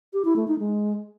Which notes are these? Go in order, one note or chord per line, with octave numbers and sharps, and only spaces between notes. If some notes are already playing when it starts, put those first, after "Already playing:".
G4
E4
A3
D#4
G#3